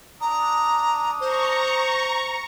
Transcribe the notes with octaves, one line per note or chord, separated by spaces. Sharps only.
D4 A#5 D#6
C5 A#5 C#6